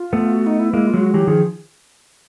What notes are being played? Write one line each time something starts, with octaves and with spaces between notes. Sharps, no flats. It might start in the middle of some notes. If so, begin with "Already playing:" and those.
Already playing: F4
A3 B3
F#4
D#4
E4
G#3 A#3 E4
F4
F#3 G#3
F#4
E3 F#3 G4
D#3 F3 G#4